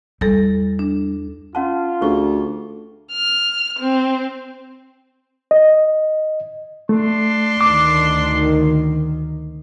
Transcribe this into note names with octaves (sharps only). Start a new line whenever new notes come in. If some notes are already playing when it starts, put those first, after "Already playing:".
E2 G3 A4 A#6
D4
C#4 F4 F#5 A5
D2 G#4 C#6
F6
C4
D#5
A3 D4 C6
D2 D#3 D6